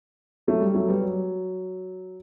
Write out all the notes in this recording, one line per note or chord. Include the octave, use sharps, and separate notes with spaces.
F#3 A3
G3
F#3 A3
G3 B3
F#3